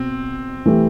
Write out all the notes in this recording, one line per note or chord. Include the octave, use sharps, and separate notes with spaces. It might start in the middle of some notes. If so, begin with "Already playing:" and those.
Already playing: B2 C4
E3 A3 E4 G4